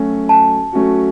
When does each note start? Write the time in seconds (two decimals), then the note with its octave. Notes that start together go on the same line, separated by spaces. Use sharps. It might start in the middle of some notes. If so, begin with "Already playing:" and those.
Already playing: F#3 A3 C#4 F#4
0.29 A5
0.73 F#3 A3 C#4 F#4